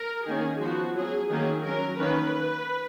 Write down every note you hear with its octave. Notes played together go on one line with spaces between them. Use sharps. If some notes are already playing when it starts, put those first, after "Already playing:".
Already playing: A#4
D#3 A#3 C#4 G#4
F3 B3 F#4
F#3 C#4 G#4
D#3 F#3 A#3 C#4 G#4
F#3 C#4 A#4
D#3 A#3 C#4 B4